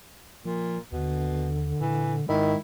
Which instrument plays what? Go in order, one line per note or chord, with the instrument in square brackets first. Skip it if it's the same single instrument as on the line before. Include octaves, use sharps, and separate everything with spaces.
[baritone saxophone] A#2 [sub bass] F3
[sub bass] D#2 [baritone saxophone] B2 [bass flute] D3
[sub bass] A#2 [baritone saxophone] E3
[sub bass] G#2 [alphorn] D#3 [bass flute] G#3 [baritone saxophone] E4